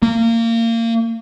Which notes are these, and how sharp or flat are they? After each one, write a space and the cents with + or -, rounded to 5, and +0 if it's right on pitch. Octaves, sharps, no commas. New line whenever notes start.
A#3 -25